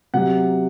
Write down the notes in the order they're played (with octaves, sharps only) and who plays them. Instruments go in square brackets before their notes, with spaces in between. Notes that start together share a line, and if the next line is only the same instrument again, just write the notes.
[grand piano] C3 F#3 F#5